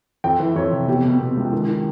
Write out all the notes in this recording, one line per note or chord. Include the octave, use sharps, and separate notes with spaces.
F2 G5
E3
F2 C#5
C3
B2 G4
B2
B2
C#2
D#3
D#3